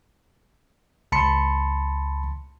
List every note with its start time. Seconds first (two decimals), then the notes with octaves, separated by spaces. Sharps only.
1.12 C#2 A5 B5 C6 C#7